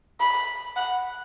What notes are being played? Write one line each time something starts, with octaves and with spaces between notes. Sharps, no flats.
B5
F#5